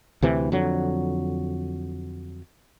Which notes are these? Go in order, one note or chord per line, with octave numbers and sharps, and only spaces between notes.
D2 C3 E3
F2 D3 F#3